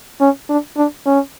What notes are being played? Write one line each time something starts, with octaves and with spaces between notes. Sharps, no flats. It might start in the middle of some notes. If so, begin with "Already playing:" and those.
C#4
D4
D4
C#4